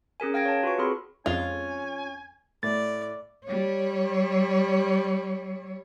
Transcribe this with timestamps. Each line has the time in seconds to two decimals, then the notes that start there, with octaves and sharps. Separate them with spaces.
0.20 C#4 G#4 A#4 G#5
0.34 F5 G5 G#6 A#6 D7
0.45 C#5 A5
0.63 F4 F#4 B4 C#6
0.78 C4 G#4 A4 B5 C6
1.26 F2 G#3 C#4 F4 G#5
2.63 A2 D5 A6
3.45 G3 C#5